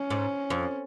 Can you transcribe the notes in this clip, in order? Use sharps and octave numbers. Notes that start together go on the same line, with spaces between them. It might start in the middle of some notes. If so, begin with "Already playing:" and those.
Already playing: C#4
G#2
F2